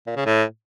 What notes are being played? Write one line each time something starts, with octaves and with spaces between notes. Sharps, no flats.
A#2
C#3
A2